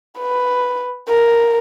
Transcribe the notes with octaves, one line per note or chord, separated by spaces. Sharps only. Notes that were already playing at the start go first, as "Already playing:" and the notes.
B4
A#4